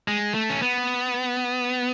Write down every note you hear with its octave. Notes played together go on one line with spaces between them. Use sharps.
G#3
A3
C#4
B3